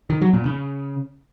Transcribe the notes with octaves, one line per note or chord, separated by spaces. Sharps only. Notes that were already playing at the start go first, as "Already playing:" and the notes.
D#3
F#3
A#2
C#3